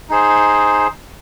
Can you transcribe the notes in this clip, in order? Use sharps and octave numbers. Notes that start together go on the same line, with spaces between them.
D#4 G#4 C5